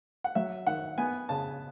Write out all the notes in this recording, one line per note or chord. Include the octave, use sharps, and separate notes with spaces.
F#5
F#3 E5
D#3 F#5
B3 G#5
C#3 A5